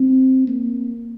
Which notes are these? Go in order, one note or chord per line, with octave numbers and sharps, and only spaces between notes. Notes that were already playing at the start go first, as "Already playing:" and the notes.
Already playing: C4
A#3